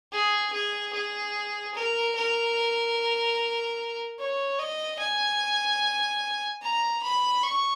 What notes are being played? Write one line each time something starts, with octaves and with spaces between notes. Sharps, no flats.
G#4
G#4
G#4
A#4
A#4
C#5
D#5
G#5
A#5
B5
C#6